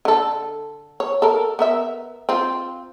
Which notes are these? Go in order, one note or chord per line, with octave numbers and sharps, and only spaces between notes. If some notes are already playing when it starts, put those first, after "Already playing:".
D3 A4
C#5
A4 A#4
B3 A#4 E5
C4 F4